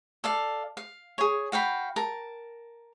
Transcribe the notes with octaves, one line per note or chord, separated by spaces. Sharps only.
A4 D5 F5
F5
G#4 C#5
F#4 F5 G5 B5
A#4 A5